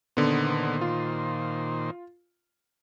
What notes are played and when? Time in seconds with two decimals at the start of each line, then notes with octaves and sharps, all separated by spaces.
0.17 A#2 D3 D#3 B3 C5
0.81 F4